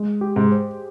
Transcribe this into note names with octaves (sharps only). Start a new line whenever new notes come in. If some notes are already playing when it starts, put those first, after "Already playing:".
Already playing: G#3
G4
G#2
C5